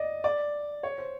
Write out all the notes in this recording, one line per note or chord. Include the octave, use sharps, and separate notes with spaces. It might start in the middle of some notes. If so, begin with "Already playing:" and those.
Already playing: D5 D#5
D5
C#5
C5